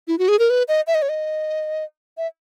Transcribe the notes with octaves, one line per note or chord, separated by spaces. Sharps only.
E4
F#4
G#4
A#4
B4
D#5
E5
D#5
C#5
D#5
E5